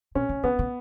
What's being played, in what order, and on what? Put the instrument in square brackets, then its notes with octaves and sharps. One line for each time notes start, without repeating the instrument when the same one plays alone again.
[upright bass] B2 [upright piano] C#4
[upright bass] C#3
[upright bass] C#3 [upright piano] B3
[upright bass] C#3